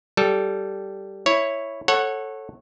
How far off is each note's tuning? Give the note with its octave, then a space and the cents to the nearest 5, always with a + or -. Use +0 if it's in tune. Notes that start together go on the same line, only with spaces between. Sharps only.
G3 -10 A4 -10
E4 +0 C#5 +0
A4 +0 C#5 -20 F#5 +0